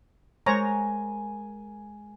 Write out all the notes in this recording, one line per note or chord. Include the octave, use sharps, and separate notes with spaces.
G#3 A#4 C5 C#5 G#5 A#5